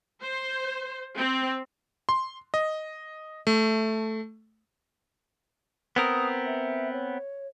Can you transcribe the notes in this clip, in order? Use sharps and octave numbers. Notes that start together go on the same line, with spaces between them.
C5
C4
C6
D#5
A3
B3 C4 A#4 D#6
E5
C#5